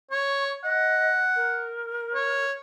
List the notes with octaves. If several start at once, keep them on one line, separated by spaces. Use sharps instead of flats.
C#5 C#6
D#5 F#5
A#4
C#5